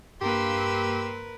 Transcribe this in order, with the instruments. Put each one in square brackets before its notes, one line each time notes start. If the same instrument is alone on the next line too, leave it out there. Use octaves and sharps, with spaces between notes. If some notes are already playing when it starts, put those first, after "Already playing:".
[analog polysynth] G2 A#3 [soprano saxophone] G4 [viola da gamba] A#4 B4 [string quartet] C6 E6